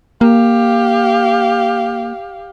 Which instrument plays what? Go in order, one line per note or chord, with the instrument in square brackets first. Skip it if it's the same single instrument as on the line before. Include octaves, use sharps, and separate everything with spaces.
[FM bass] A#3 [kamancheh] G4 F5